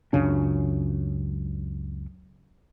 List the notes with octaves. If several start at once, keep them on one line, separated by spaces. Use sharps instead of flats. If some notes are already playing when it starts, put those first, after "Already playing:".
C#2 F#2 C#3 D4